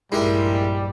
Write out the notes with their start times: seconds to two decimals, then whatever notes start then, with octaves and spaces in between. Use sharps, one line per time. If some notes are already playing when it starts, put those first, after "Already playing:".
0.12 A#1 G2 G3 G#3 D#4 E4 G4 A#4